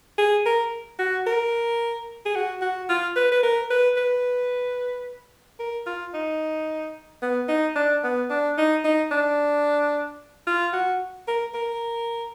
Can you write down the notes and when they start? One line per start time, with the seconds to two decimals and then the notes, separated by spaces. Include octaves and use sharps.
0.18 G#4
0.46 A#4
0.99 F#4
1.26 A#4
2.25 G#4
2.35 F#4
2.61 F#4
2.89 F4
3.16 B4
3.32 B4
3.43 A#4
3.70 B4
3.97 B4
5.59 A#4
5.86 F4
6.14 D#4
7.22 B3
7.48 D#4
7.76 D4
8.03 B3
8.30 D4
8.58 D#4
8.84 D#4
9.11 D4
10.47 F4
10.73 F#4
11.28 A#4
11.54 A#4